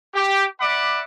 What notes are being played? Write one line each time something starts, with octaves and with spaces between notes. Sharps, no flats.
G4
D5 E5 F#5 B5 D6